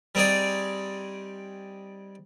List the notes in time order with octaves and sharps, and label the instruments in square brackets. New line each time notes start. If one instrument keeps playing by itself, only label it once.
[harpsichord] G3 C4 D#4 G#4 D5